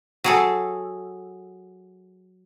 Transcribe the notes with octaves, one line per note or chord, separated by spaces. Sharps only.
F#3 G#4 A4